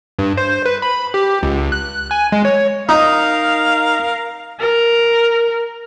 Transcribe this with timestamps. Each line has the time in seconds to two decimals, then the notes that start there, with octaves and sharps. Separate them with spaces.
0.19 G2
0.37 C5
0.66 B4
0.82 B5
1.14 G4
1.43 C#2
1.72 F#6
2.11 G#5
2.32 G#3
2.45 C#5
2.89 D#4 A#4 F5
4.60 A#4